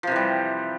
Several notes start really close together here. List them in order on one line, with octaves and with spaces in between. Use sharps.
F3 C3 E3 G3